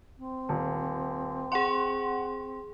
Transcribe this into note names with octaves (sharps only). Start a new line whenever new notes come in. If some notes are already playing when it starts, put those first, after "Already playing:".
C4
D#1
G#4 F#5 C6